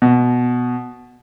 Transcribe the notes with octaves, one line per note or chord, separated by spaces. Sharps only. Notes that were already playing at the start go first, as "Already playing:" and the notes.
B2